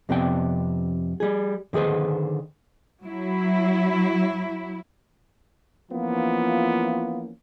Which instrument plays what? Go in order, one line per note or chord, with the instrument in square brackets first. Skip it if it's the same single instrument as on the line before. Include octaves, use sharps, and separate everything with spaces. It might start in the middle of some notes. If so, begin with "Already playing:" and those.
[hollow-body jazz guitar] F2 C3 B3 D4 G5
G3 G#4
D3 D#3 G#4 B4 C5
[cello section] F#3 E4
[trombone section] E3 F3 A#3 B3 C#4 F4